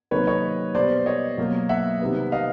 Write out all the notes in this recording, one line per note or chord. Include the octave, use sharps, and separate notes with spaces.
C3 D#3 F#3 A#3 B4 C#5
C#5 D#5
B2 G3 B3 C5 D5
C#5 D#5
B2 F#3 A#3
E5 F#5
C3 D#3 G3 B3
D#5 F5